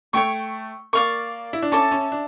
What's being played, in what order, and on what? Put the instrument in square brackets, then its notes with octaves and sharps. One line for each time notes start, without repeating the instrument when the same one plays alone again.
[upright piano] A3 [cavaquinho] C#5 G5 C#6
[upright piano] A#3 [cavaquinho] D5 F5 C#6
[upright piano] E4
D4
[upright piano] C#4 [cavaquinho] A4 E5 A5 D6
[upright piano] C#4
D4